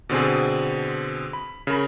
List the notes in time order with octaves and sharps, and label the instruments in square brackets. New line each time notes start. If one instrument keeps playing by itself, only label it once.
[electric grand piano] B2 D3 C4 G#4
B5
C#3 A#4 B5